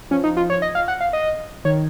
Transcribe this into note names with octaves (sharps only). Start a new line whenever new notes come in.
F3 C#4
D#4
F4
C#5
D#5
F5
F#5
F5
D#5
D#3 C#5